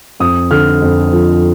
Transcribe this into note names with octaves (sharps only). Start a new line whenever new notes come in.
F2 D#6
D3 F6
F2
F3